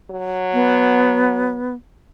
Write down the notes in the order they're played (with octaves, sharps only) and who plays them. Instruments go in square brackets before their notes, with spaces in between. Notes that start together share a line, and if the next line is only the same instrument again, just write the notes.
[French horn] F#3
[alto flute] B3